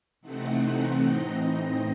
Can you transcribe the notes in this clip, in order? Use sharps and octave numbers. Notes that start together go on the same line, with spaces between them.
C3 E3 A3 C4 D#4 F#5
A2 E3 C4 D#4 D#5